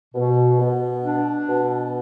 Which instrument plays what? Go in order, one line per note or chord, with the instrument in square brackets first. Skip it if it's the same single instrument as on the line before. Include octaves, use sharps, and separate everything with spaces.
[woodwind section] B2
B2
D4
B2